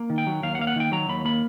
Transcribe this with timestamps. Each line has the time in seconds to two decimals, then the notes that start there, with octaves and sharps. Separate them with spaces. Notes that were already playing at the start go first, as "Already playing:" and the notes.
Already playing: A#3
0.10 D#3
0.18 G5
0.27 F#3
0.43 D#2 F5
0.55 F#5
0.59 A#3 F5
0.67 F#5
0.76 D#3 G5
0.92 F#3 A#5
1.09 D#2 B5
1.25 A#3 B5